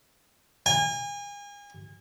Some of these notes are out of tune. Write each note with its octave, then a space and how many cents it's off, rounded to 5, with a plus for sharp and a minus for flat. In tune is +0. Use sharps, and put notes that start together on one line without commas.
G#5 -35